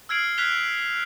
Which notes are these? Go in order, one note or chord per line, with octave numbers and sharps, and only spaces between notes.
E6 F6 G#6 C7 D7 F#7
F6 F#6 G#6 B6 F7 G7